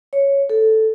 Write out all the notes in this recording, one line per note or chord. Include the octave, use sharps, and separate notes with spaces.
C#5
A4